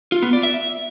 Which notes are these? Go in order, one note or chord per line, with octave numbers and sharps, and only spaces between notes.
F4
B3
D5
E5